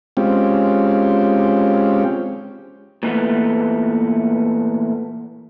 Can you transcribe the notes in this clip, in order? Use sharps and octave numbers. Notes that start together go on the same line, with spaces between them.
G#3 C4 C#4 F4 G4
A#2 E3 A3 B3